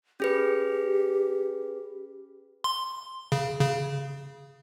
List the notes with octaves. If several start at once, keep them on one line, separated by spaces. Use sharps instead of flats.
C#4 G4 G#4 B4
C6
C#3
C#3